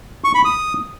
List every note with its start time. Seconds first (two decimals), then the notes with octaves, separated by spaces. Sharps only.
0.24 C#6
0.35 B5
0.45 D#6